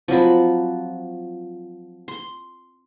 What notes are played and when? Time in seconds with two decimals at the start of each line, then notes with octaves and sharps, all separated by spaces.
0.08 F3 F#3 C4 F4 C5 B5
2.08 C6